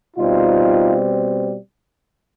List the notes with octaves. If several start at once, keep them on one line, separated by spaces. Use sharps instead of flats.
B2 G3 C4 D#4 F4